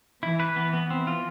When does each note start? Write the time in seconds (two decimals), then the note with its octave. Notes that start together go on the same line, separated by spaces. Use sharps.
0.23 E3 E4
0.40 B4
0.56 B3
0.74 B3
0.90 E3 C4
1.07 F4